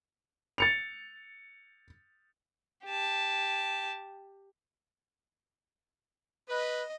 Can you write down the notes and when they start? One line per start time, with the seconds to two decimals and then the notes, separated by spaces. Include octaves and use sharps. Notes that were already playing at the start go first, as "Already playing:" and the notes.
0.58 A6 C#7 F7
2.85 G4 A5
6.49 B4 D#5